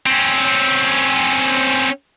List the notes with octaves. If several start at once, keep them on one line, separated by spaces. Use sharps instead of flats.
C4 C#4